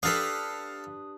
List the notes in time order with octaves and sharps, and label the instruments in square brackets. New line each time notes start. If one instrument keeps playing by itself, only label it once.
[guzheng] D4 G4 B4 [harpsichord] A4 F5 [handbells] D#6